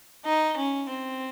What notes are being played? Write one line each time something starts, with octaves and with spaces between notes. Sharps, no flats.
D#4
C#4
C4